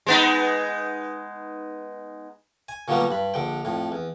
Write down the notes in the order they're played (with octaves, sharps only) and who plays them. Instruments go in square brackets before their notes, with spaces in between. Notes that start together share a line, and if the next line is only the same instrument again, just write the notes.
[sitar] G#3 B3 D#4
[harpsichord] G#5
A#2 D3 F#3 G3 A#3 B3
G2 B5
A#1 D3 G5
F2 A2
E2